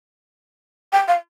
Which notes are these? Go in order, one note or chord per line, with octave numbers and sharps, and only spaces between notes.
G5
F5